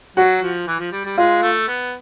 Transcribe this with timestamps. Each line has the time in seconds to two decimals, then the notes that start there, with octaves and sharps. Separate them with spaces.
0.17 F#3 F#4
0.42 F3
0.67 E3
0.79 F3
0.92 G3
1.05 G3
1.18 G#3 F4
1.42 A3
1.68 B3